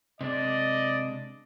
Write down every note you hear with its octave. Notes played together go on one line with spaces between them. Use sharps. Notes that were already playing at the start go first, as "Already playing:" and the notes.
C3 G#3 D4 D5 D#5